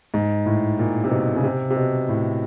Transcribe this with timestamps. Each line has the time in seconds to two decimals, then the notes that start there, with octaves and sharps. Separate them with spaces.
0.14 G#2
0.46 A2
0.79 A#2
1.04 C3
1.11 B2
1.36 C#3
1.44 C3
1.70 C3
1.76 B2
2.09 A2